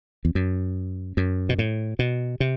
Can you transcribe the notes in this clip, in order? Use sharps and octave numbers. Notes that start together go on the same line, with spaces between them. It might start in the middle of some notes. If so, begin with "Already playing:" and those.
E2
F#2
F#2
B2
A2
B2
C3